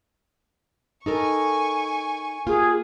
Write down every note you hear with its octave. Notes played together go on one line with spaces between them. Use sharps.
D#4 A4 A#4 G#5 C#6
A#3 F4 G4 G#4